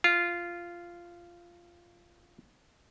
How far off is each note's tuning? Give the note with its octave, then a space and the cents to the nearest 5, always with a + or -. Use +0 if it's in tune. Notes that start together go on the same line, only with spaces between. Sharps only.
F4 -10